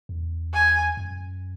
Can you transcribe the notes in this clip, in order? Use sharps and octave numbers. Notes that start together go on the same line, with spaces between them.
E2
G#5
F#2